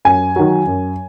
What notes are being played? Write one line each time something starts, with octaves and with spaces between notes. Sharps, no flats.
F#2 G#5
D#3 F#3
F#2